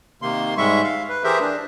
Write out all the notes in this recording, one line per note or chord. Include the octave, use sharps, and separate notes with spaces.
C3 D#3 A#3 C6
G#2 G3 G#3 E5 C#6
F5
B4
E3 G4 G#4 A#4 C5 E5
D4